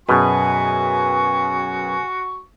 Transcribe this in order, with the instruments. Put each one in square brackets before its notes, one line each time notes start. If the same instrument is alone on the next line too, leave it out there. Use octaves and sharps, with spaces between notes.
[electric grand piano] F#2 G#4 B4 [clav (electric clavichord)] B2 [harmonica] F#4 C#6 [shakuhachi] G#5